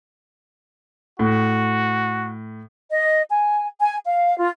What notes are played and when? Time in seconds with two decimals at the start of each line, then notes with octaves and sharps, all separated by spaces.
1.19 A2 F#4
2.90 D#5
3.30 G#5
3.80 G#5
4.06 F5
4.39 F4